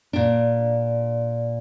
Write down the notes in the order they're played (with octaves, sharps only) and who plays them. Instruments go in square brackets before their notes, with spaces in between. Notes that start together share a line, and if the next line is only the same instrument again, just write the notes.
[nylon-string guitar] A#2 D4